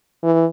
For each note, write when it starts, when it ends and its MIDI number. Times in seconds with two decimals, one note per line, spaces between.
0.23 0.45 52